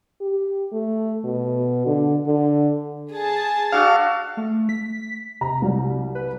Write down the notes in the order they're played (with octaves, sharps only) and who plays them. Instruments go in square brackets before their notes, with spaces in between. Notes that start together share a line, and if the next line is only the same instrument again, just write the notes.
[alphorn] G4
A3
B2
D3
D3
[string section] G#4 A5
[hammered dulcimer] D4 F#4 A4 [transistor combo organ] F5
[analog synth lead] A3
B6
[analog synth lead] C3 [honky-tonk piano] A#5
[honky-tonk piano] C2 F#3 G3
[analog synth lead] B4